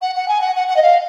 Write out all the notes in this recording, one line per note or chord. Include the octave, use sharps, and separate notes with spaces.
F#5
F#5
G#5
F#5
F#5
F#5
D#5
F5